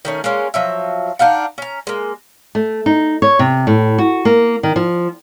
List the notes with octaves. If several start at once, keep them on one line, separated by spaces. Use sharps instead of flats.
D#3 A3 C#4
G#3 A#3 C#4
F3 F#3 E5
D4 D#4 F5 F#5
C#4 A#5
G#3 A#3
A3
D#4
C#5
C3
A2
F#4
A#3
D#3
F3